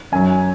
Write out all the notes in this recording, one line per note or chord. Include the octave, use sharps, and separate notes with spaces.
F#2 F#3 G#5